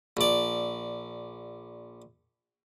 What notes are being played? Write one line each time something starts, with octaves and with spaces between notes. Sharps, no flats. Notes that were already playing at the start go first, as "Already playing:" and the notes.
A#1 D5